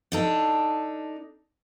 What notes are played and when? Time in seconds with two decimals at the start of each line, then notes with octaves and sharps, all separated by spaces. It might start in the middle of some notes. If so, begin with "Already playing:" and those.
0.12 D4 D#4 A4